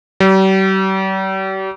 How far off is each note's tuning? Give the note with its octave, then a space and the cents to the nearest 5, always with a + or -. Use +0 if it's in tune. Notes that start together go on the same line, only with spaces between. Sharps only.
G3 -40